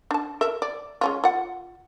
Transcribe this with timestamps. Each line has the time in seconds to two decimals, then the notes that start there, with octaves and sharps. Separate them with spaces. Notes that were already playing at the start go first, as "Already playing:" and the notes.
0.11 D4 A5
0.41 A4 A#4 E5
0.62 D5
1.01 G#3 C#4 F4
1.24 F4 F#5